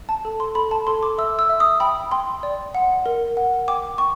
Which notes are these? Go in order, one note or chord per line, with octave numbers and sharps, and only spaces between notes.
A5
A4
C6
A4 B5
A5
A4 C6
D6
E5 E6
E6
E5
D#6
G5 B5
G5 C6
D5
F#5
A#4
F#5
G5 D6
G5 C#6